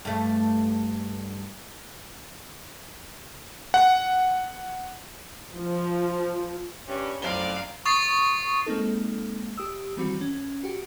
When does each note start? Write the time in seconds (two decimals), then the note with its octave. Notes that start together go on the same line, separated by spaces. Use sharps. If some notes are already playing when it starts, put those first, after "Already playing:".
0.05 G2 A3
3.74 F#5
5.57 F3
6.88 G2 G3 C#4
7.22 F#2 A2 F3 C4 D5 F5 G7
7.86 C#6 D#6 A6 C7
8.66 G#3 A#3 C4 D#4 A4
9.57 G4 D#6 E6
9.97 D#3 E3 G3 C4 F#4
10.21 C#4
10.63 F#4 G4